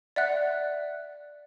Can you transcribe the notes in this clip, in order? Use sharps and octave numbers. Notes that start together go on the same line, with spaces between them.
D5 E5 F#5 F#6